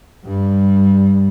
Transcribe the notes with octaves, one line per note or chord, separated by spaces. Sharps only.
G2 G3